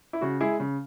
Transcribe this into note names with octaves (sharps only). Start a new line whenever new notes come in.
E4
C#3 F#4
G#3 E4 G#4
C#3